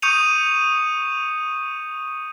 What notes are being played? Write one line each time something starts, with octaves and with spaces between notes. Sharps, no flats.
C#6 D#6 G6 C#7 D#7 F7